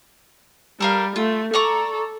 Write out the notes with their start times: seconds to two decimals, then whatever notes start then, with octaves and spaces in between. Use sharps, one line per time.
0.80 G3 A4 A#4 F5
1.16 A3 F4
1.54 A4 D5 A#5 C#6